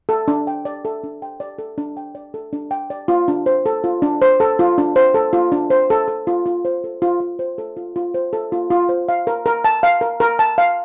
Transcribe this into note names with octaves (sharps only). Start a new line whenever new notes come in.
A4
D4
G5
D5
A4
D4
G5
D5
A4
D4
G5
D5
A4
D4
G5
D5
F4
D4
C5
A4
F4
D4
C5
A4
F4
D4
C5
A4
F4
D4
C5
A4
A4
F4
F4
C5
A4
F4
F4
C5
A4
F4
F4
C5
A4
F4
F4
C5
F5
A#4
A#4
A5
F5
A#4
A#4
A5
F5